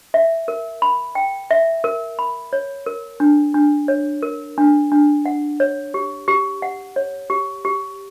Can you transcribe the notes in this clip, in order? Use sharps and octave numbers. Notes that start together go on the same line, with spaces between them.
E5
A#4
B5
G5
E5
A#4
B5
C#5
A#4
D4
D4
C#5
A#4
D4
D4
F#5
C#5
G4
G4
F#5
C#5
G4
G4